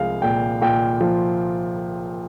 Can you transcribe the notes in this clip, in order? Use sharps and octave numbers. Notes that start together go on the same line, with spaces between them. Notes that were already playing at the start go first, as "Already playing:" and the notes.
Already playing: C2 F3 G#3 F5
A#2 G5
A#2 G5
F3